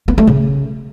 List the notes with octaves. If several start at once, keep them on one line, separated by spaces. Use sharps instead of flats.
B3
A3
C#3